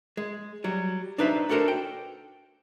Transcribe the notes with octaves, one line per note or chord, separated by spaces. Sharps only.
G#3
F#3 G3
D4 D#4 B4 C5 E5
D4 F#4 A4 A#4 C5
G5